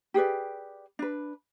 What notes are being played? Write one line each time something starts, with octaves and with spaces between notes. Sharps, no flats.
G4 G#4 B4 D5
D4 B4